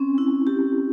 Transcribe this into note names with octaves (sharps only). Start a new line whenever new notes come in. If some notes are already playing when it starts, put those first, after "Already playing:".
Already playing: C4 C#4
E4
G4